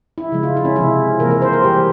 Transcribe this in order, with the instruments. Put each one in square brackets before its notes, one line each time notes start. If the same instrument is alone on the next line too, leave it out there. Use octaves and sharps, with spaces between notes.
[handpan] E4
C#3 F3 G#3
F4
E4
C#4
C3 F3 G#3 E4
C3 E3 A#3 A#4
A#4
C5
A#4
E3 G3 A#3 G4